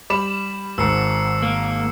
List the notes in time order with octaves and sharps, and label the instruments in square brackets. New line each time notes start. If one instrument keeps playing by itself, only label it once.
[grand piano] G3 B5 E7 [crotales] D6
[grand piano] G#1 G#2 [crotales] E6 C7 C#7
[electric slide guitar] A#3